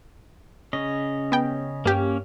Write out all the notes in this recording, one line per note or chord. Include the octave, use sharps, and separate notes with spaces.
C#3 C#4 D#5
B3 G5
G2 A#3 C#4 G4